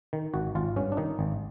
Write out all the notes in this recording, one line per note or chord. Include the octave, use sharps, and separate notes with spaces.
D#3
G#1 F#4
G#1 F4
G2 C#4
D4
D#3 D#4
G#1